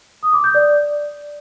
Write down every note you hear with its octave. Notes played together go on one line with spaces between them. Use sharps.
D#6
D6
G6
D5